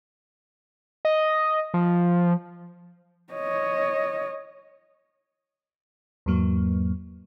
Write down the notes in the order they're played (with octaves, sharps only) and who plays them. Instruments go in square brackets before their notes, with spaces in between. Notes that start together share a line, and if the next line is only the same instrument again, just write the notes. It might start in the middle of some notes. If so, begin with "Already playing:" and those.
[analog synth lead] D#5
F3
[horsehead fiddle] C#5 D#5
[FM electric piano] E2 G#2 F#3 A#3